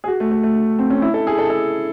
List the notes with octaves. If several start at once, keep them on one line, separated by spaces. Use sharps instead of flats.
G#4
F#4
A3
A3
A3
C4
C#4
E4
A4
G#4
A4
A4